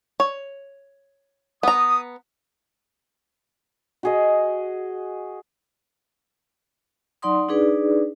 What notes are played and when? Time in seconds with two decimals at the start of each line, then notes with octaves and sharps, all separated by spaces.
0.20 C#5
1.63 B3 A#5 D#6
4.03 F#4 G#4 D#5
7.22 F#3 D#4 D5 F#5 C6 D#6
7.49 D4 D#4 G#4 B4 D5